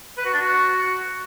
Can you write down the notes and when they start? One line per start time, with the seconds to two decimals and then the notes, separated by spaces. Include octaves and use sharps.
0.17 B4
0.25 F#4
0.33 D4
0.41 F#4